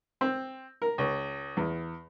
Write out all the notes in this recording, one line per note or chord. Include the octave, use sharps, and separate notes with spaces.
C4
A#4
C#2
E2